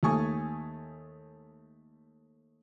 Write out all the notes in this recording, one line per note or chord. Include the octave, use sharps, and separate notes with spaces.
D#2 A3 G#5 C#6 D#6